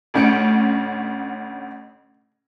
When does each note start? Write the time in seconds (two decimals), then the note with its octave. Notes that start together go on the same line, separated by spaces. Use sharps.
0.14 A1 D2 C#4 G6 C#7 D7